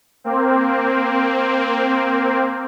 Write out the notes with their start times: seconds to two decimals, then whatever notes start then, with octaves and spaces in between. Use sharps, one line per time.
0.24 A#3 C4